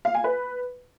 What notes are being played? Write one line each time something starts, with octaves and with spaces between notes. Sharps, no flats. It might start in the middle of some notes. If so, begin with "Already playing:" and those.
F5
G#5
B4